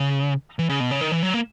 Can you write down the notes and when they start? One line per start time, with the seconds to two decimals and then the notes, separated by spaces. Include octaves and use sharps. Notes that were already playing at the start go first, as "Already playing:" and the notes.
Already playing: C#3
0.59 E3
0.69 C#3
0.80 B2
0.91 C#3
1.01 D#3
1.12 E3
1.23 F#3
1.34 A#3